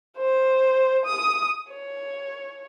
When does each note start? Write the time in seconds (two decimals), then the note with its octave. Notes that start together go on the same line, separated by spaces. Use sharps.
0.17 C5
1.05 D#6
1.70 C#5